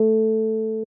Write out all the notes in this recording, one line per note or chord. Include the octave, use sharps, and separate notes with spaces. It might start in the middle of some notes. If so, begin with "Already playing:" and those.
Already playing: A3